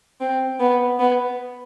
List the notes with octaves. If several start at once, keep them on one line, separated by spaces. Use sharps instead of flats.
C4
B3
B3